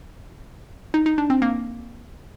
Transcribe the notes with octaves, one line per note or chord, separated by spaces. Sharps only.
D#4
D#4
D4
C4
A#3